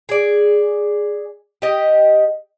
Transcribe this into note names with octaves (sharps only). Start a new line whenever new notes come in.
G#4 D5
G4 D#5